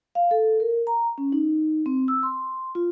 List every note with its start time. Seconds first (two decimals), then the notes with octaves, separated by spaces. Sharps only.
0.15 F5
0.31 A4
0.60 A#4
0.87 A#5
1.18 C#4
1.32 D#4
1.86 C4
2.08 E6
2.23 C6
2.75 F4